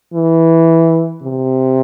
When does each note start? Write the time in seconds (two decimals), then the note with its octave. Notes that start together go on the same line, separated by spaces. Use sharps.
0.14 E3
1.23 C3